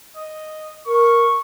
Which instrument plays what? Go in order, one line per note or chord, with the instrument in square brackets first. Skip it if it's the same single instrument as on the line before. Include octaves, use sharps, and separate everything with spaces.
[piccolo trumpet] D#5
[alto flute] A#4 [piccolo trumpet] C#6